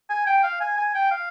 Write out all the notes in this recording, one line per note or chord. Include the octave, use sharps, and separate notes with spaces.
G#5
G5
F5
G#5
G#5
G5
F5